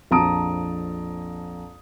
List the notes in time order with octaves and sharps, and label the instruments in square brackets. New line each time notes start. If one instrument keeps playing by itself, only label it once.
[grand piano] A#1 F2 A5 A#5 D#6 D7